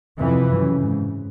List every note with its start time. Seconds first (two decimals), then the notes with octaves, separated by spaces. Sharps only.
0.19 F2 C3 E3
0.50 F#2 C#3
0.81 G#2